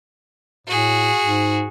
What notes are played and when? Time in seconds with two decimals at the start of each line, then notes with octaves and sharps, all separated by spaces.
0.67 A2 F#4 G#4
1.21 G#2